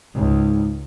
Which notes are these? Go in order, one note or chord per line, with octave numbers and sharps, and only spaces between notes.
C#2 G#2